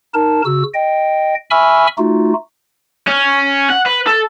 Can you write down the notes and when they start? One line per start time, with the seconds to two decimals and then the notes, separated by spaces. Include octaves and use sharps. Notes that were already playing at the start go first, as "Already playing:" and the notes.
0.14 D#4 A#4 A5
0.45 C#3 F#4 E6
0.74 D#5 G5
1.50 E5 G#5 B5 C#6 E6 F6
1.98 A3 D#4 F4 F#4
3.07 C#4
3.70 F#5
3.86 B4
4.07 A4